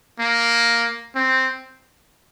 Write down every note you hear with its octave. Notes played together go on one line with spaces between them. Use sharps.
A#3
C4